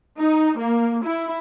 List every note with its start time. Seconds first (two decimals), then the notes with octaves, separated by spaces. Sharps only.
0.19 D#4
0.57 A#3
1.03 E4